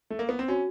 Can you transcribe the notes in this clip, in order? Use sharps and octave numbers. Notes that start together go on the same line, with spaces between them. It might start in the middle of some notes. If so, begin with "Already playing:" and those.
A3
A#3
B3
C4
C#4 F#4